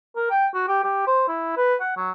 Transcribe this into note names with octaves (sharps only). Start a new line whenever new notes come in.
A#4
G5
F#4
G4
G4
C5
E4
B4
F#5
F#3